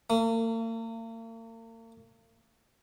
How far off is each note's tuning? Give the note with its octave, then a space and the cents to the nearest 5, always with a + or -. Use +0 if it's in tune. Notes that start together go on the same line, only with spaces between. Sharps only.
A#3 -45